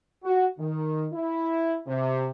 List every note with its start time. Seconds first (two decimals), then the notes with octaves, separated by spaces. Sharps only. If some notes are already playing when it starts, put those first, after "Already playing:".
0.24 F#4
0.58 D#3
1.12 E4
1.87 C3